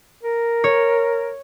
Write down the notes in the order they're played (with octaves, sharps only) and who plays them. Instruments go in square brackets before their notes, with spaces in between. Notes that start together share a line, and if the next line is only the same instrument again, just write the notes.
[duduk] A#4
[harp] C#5